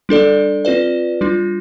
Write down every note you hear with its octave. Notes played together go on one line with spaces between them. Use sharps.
G3 D4 A4 D5
C4 F4 B4 D5
G3 D4 F4